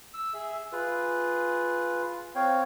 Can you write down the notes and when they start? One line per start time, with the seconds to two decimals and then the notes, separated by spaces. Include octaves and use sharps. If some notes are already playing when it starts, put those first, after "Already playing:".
0.14 E6
0.34 G#4 E5
0.72 F4 G#4 B4
2.35 C4 C#5 F5 G5